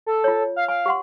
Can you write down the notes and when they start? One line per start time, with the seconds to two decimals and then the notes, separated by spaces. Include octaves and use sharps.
0.06 A4
0.24 F4 C#5
0.56 F5
0.68 F5 G#5
0.86 G4 F#5 C6